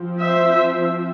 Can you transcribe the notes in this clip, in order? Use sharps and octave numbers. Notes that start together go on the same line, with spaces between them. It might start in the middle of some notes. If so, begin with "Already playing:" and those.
Already playing: F3 C4
C5 E5